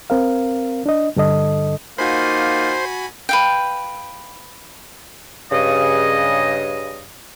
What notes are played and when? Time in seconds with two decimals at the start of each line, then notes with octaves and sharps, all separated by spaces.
0.10 C4 A#4 F5
0.86 D4 D#5
1.16 G2 D3 A4 D#5 D#6
1.98 A#3 D#4 F4 F#4 C5 G#5 B5
3.29 B4 F5 G5
5.52 G2 C#3 D#5